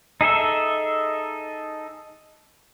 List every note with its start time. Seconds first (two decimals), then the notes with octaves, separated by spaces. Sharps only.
0.21 D#4 G#4 A4 E5